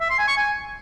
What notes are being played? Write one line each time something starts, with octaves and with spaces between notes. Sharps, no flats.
E5
C6
G#5
C#6
G#5